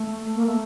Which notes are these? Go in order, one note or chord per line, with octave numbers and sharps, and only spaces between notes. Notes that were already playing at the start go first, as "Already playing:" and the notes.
Already playing: A3
A#3
A3